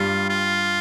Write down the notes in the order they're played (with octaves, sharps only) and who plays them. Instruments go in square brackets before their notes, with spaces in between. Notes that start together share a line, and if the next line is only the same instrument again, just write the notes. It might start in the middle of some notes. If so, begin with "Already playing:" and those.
Already playing: [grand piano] G2 G3 [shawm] F4
[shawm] F4